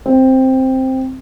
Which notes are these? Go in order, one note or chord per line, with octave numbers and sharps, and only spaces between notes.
C4